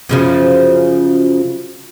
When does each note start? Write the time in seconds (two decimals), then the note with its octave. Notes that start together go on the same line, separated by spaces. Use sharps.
0.09 F#2 C#3 F3